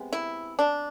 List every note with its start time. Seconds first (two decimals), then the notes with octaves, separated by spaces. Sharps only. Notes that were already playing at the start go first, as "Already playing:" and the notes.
Already playing: C3 G#3 B3
0.13 E4
0.59 D4